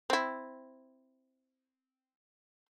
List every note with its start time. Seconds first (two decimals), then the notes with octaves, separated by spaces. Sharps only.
0.10 C4 E4